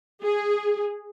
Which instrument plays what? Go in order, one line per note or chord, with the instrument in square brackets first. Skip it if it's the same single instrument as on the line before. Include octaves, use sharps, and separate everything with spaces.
[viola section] G#4